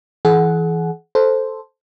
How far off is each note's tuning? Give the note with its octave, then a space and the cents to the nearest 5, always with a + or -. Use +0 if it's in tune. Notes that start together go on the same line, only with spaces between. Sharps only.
E3 +0 G#4 +40 F#5 +0
A4 +0 C5 +0